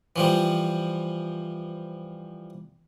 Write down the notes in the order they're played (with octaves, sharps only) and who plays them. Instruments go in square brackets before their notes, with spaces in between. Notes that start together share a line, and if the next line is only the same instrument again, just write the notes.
[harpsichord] E3 F3 G3